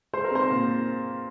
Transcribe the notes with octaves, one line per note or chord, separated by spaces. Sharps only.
G#3 C5
A#4
C4 C5
A#2